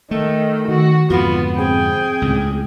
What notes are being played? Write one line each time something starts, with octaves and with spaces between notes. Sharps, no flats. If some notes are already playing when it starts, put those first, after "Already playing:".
D#3 A3 A4
D#3 F#4
F2 G#2 D3 B3 F4 F#4
C4 G#4 G5
C#2 A2